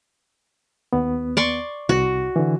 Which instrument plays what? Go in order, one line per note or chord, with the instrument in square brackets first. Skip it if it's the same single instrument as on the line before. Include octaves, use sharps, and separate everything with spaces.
[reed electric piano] D#2 B3
[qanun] D5 C6 C#6
[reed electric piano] C2 [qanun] F#4
[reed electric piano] D3 E3